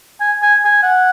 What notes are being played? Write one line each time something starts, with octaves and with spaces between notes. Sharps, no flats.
G#5
G#5
G#5
F#5